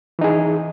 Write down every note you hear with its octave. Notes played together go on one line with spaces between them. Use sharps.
E3 D#4 G#4